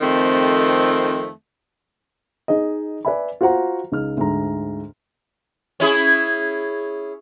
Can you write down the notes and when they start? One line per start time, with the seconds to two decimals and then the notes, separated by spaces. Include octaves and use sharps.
0.01 F2 D#3 A3 C4
2.48 D#4 G#4 D#5
3.05 B4 D5 E5 G#5 B5
3.41 F4 F#4 C5 F#5 A#5
3.92 C#2 D#4 G#4 F6
4.17 D2 G#2 A#5
5.80 C#4 E4 G#4